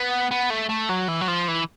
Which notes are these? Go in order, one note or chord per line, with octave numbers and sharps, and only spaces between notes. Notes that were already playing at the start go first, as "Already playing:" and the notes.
Already playing: B3
B3
A3
A3
F#3
E3
F#3
F3
E3